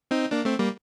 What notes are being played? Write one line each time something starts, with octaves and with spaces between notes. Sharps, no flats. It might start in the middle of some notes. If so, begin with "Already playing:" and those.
C4 D#4
A#3 D4
A3 C4
G3 A#3